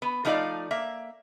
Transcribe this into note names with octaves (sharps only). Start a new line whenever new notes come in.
B3
F3 A3 D#4 G4 D5 F5
A#3 E5